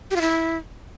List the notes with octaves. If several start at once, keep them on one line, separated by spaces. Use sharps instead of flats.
G4
F4
E4